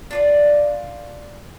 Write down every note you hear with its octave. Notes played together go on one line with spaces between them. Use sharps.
D4 F4 D5